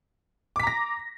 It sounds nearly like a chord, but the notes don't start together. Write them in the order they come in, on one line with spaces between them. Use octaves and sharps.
D6 B6 A#5 A#6